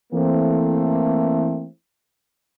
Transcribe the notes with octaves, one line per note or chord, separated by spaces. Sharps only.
E3 A3 A#3 C4